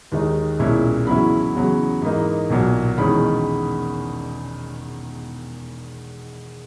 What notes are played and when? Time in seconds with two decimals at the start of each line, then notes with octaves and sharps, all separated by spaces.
0.12 D#2 D#3 G#3 D#4
0.59 B1 A#2 G#3 C#4 E4
1.06 E2 C#3 F#3 C#4 E4 B5
1.55 E2 C#3 F#3
2.02 G#2 E3 A#3 D#4
2.50 B1 A#2 F#3
2.98 E1 E2 D#3 G#3 C#4 B5